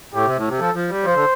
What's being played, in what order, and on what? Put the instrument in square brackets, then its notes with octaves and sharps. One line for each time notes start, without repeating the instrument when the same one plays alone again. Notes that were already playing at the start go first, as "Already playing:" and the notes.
[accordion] A2 [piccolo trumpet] G4
[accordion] C3
A2
C3
[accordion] F3 [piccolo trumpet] A4
[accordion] F3
G3
[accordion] F3 [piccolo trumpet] C5
[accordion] D3